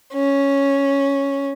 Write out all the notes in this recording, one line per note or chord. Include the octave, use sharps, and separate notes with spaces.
C#4